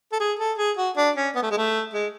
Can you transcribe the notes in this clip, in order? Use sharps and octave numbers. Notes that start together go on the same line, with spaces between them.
A4
G#4
A4
G#4
F#4
D4
C#4
B3
A3
G#3
A3
G#3